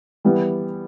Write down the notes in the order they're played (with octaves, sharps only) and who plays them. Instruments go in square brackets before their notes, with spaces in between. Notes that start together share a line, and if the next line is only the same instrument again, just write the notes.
[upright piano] E3 G3 B3